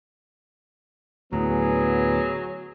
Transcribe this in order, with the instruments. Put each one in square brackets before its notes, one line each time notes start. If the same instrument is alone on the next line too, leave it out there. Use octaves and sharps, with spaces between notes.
[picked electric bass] D2 A2 [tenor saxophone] F#3 [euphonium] B3 [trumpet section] G#4